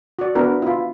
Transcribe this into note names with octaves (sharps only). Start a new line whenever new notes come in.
F#4 D5
B3 D4 E4 F#4 A#4
E4 F4